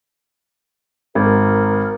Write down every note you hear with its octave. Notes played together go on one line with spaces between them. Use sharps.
G#1 A#4